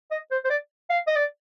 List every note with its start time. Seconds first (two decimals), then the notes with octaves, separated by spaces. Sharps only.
0.11 D#5
0.31 C5
0.44 C5
0.50 D5
0.90 F5
1.07 D#5
1.16 D5